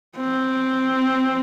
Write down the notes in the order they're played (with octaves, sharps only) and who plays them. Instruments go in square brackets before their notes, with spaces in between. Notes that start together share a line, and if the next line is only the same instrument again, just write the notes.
[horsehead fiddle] C4